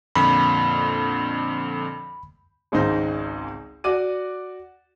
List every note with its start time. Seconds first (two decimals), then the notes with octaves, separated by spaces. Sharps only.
0.16 F2 A#2 D3 B5
2.72 G#1 C#2 G#2 D#4 C5
3.84 F#4 D5 D6 D#7